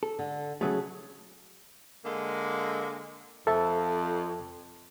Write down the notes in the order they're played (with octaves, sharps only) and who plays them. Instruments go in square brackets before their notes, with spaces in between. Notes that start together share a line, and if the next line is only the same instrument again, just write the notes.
[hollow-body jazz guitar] A4
[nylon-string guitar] D3
[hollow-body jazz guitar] C#3 F#3 A3 [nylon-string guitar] G#4 A4
[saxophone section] D3 G#3 A#3
[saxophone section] F2 [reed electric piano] A4 E5 A5